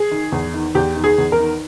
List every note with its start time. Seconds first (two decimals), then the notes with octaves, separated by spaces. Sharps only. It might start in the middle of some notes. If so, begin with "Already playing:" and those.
Already playing: G#4
0.11 D#3
0.32 E2
0.54 D#3
0.75 E2 G4
0.96 D#3
1.04 G#4
1.18 E2
1.32 A#4
1.39 D#3